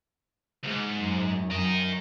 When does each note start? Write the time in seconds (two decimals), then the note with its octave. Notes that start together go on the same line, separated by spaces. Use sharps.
0.63 C#2 G#2
0.98 F#2
1.51 F#2 A#4 D#5